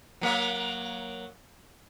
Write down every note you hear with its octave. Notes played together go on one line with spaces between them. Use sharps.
F#3 A#3 C#5